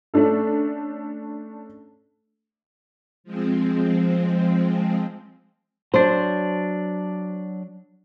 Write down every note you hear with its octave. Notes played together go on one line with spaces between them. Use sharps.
A3 C#4 D4 A4
F3 G#3 C4
F#3 D4 C5